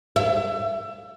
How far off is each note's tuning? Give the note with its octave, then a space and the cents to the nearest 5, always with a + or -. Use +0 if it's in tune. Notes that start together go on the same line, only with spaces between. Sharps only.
E5 +25